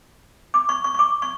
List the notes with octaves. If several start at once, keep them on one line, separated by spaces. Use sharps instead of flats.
D6
C#6
C#6
C#6
D6
C#6